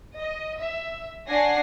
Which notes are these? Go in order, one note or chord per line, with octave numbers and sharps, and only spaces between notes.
D#5
E5
D4 C#5 F#5 G#5 A#6 C7